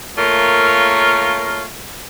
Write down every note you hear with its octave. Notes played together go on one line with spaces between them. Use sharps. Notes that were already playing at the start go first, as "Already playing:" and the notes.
A3 A#3 F4 A#4 C#5